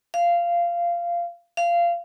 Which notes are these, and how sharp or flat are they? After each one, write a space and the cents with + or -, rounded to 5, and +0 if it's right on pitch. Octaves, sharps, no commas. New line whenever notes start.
F5 -15
F5 -20